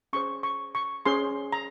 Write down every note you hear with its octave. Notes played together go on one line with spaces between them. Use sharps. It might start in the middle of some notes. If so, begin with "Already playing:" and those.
C#4 G#4 C5 C#6
C#6
C#6
C#4 G#4 C5 C6
A#5